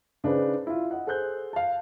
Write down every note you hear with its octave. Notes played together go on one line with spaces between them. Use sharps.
C#3 D4 D#4 G#4 B4 C5
E4 F4
D#5 F#5
G#4 A4 C5 F#6 G6
F5 A5